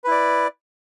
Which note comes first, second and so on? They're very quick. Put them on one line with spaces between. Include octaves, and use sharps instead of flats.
B4 E4 D5